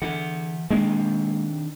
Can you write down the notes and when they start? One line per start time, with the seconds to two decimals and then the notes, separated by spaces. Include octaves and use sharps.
0.02 D3 E3 E5 F#5
0.71 D#3 G#3 A#3 C4 D4